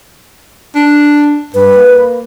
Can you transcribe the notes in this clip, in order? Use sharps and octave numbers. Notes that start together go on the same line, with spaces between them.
D4
G2 B4
A#3